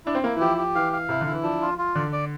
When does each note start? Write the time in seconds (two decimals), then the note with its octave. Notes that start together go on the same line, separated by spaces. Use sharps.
0.06 D4 E4
0.15 C4
0.23 A#3 E4
0.36 E3
0.40 F3 G4
0.57 G4
0.75 E3 F5
0.93 F5
1.09 C3 E4
1.21 D3
1.27 E4
1.32 E3
1.43 F3 D4
1.61 F4
1.78 F4
1.95 D3 D5
2.12 D5